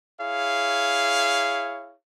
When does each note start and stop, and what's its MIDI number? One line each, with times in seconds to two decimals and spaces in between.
0.20 1.94 64
0.20 1.94 68
0.20 1.94 73
0.20 1.94 77